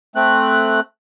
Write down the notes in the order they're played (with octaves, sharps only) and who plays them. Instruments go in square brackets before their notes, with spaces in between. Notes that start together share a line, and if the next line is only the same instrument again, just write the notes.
[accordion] A3 C4 F#6